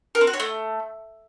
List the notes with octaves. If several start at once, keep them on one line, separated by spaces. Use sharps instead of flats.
A#4
C4
F#4
C#5
A3